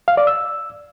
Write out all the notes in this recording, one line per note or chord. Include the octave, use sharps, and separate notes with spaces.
F5
D5
E6